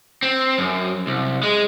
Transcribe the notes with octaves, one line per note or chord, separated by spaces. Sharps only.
C4
F#2
C2
G#3